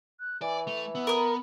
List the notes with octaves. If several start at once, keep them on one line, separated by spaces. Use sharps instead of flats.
F#6
E3 D5 G#5
A3 F7
B3 E6
A#4 B5 D#6